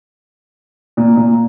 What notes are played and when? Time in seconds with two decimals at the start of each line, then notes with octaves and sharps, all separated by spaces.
0.97 A#2
1.17 A#2